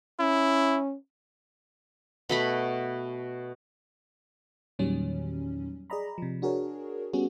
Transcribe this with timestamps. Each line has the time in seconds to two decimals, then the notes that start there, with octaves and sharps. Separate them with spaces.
0.20 C#4 E4
2.29 B2 A3 B5
4.79 E2 A#2 D#3 F#3 G3 C#4
5.90 G#4 D5 D#5 A#5 B5
6.18 C3 F3
6.42 D4 F#4 G#4 A#4 C#5
7.13 G3 B3 C#4 F#4 G#4